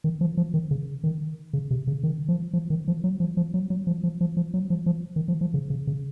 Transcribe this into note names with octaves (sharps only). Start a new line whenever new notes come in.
D#3
F3
F3
D#3
C#3
D#3
C#3
C3
C#3
D#3
F3
F3
D#3
F3
F#3
F3
F3
F#3
F#3
F3
F3
F3
F3
F#3
F3
F3
D#3
F3
F3
C#3
C#3
C#3